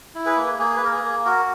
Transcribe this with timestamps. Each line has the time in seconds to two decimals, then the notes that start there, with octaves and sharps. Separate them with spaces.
0.15 E4
0.26 G#4 B4
0.36 A#3
0.59 A#3 G#4
0.77 B4
0.81 A#3 A#4
0.92 G#4
1.03 A#3
1.25 F#4 A#4